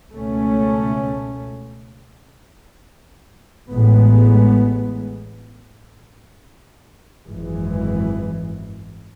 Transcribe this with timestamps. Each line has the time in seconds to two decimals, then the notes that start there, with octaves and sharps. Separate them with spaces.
0.13 C#2 B2 A3 C#4
3.70 A1 A2 G#3 B3
7.29 G#1 F#2 E3 G#3